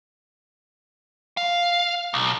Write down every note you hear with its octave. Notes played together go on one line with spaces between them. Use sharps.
F5
B1